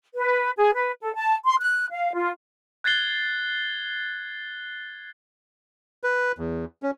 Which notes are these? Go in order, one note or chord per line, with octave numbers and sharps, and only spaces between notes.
B4
G#4
B4
A4
A5
C6
F#6
F5
F4
F#6 G#6 A6 C7 G7
B4
E2
C#4